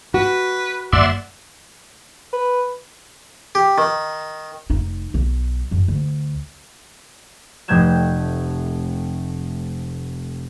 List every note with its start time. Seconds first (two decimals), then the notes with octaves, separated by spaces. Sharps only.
0.14 F#4 B4
0.93 G1 F#2 A#3 D5 E5 F#5 C6
2.33 B4
3.55 G4
3.78 D#3
4.70 F1 D#4
5.14 B1
5.71 F#2
5.88 D2
7.68 F1 C3 A3 G6 G#6 E7